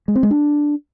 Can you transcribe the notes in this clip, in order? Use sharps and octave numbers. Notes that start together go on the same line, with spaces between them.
G#3
C4
G#3
D4